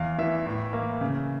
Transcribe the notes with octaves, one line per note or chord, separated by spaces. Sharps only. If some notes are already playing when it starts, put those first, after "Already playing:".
Already playing: E2 F5
E3 E5
A2
A#3
C#3